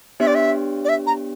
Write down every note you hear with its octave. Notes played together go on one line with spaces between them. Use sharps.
B3 D4 G4 C#5 E5
D5
E5
D5
E5
A#5